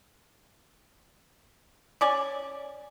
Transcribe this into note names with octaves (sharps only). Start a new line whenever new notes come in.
C#4 D5 G#5